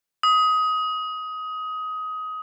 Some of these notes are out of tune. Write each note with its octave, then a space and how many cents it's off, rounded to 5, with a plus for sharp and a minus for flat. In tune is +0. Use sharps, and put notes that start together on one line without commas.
D#6 +20